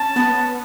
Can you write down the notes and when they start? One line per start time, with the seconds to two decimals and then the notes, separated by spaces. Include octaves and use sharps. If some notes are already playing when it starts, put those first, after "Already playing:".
Already playing: C#4 A5
0.16 B3